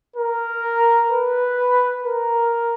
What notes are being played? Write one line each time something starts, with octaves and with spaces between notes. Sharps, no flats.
A#4
B4
A#4